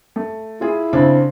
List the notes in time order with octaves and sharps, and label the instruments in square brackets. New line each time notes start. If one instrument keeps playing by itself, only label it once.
[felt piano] A3
[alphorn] E4 [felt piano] F4 G#4
[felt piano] C#3 C4 D4